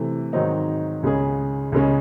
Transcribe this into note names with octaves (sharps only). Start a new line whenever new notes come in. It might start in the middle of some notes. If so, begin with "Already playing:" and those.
Already playing: C3 E3 A3
G#2 D#3 F#3 C4 D#4
C#2 C#3 G#3 C#4 G#4
C#2 C#3 G#3 C#4